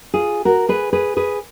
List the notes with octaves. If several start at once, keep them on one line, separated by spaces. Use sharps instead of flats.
F4 G#4
F#4 A#4
G#4 B4
G#4 B4
G#4 B4